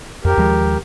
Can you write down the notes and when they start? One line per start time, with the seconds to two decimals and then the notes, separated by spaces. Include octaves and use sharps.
0.25 F2 G4 A#4
0.38 D#2 F3 G#3